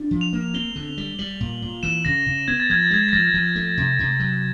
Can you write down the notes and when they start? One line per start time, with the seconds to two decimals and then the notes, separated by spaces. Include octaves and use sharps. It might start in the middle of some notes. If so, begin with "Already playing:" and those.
Already playing: D4
0.11 F3
0.21 F7
0.33 A#3
0.54 C4 G7
0.76 D3
0.98 G3
1.19 G3 F#7
1.40 A#2
1.62 A#2
1.83 E3 E7
2.05 C#3 A#6
2.26 C#3
2.48 B3 G#6
2.60 A6
2.70 F3 G#6
2.83 A6
2.91 G#3 G#6
3.09 A#6
3.13 F3 A6
3.34 F3
3.56 A3
3.77 C3
3.99 C3
4.20 F#3